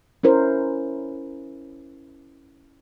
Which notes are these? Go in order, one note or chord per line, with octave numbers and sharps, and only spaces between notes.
C#4 E4 A#4 C5